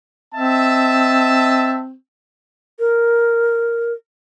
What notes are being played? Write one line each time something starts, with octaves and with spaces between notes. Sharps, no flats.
C4 D#5 E5 A5
A#4